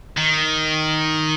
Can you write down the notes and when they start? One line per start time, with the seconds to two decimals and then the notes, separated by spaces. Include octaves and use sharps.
0.17 D#3